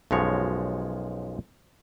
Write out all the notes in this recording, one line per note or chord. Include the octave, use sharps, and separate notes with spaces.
B1 F#2 F3 G#3 C#5